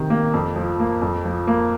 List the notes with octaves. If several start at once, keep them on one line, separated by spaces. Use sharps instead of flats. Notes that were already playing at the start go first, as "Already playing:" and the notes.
Already playing: C3 D#3
A#3
F2
F3
A#3
F2
F3
A#3